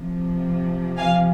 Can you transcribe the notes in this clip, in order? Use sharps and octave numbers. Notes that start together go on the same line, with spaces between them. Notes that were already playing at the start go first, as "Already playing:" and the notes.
Already playing: C3 F3
F5 G#5